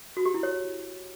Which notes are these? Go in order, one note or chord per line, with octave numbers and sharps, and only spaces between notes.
F#4
G4
E4
C#5